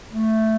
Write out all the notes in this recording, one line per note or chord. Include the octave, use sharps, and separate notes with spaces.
A3